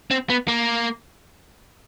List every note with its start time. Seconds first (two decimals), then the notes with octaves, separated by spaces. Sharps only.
0.11 C4
0.30 B3
0.48 A#3